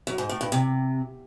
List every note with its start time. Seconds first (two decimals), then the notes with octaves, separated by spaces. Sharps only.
0.07 F#2
0.18 G#2
0.29 A2
0.41 G2
0.52 C3